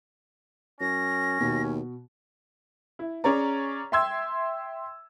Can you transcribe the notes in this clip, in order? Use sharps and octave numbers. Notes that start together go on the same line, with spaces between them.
F#2 C#4 A#6
D#2 B2 F#4
E4
C#4 G#4 C#5 D5 A#5
E5 G5 C6 E6 G#6